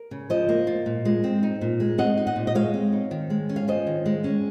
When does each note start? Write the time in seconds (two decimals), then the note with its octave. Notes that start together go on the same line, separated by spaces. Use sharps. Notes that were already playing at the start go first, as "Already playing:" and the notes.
Already playing: A#4
0.11 C#3
0.30 F3 C5 D#5
0.49 A#3
0.67 F4
0.86 A#2
1.05 G#3
1.24 C4
1.43 D#4
1.61 A#2
1.80 G#3
1.98 C4 D#5 F#5
2.17 D#4
2.27 D#5 F#5
2.36 A#2
2.47 D#5
2.55 G#3 C#5 F5
2.74 C4
2.93 D#4
3.11 D#3
3.30 G#3
3.49 C#4
3.56 F5
3.68 F4 C5 D#5
3.87 D#3
4.06 G#3
4.24 C#4